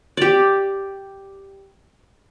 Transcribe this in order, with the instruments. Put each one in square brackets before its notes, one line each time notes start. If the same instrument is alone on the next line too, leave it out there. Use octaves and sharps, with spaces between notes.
[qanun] G4 D5